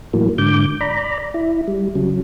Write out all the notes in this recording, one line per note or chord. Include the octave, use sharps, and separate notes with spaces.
A2 E3 F#3 A#3
G#2 D3 D6 G6
D5 A#5 B5
E4
G3
C#3 F#3